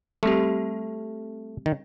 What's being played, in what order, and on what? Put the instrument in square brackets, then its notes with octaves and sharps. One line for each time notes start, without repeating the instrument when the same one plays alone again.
[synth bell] G3 C4 G4 [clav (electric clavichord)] A3
[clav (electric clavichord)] D#3